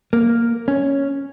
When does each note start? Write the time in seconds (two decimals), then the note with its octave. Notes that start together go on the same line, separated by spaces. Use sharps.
0.13 A#3
0.68 C#4